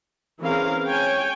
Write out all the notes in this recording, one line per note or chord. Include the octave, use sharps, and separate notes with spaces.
E3 C4 C#4 G#4 A#4 F5
C#5 G5 G#5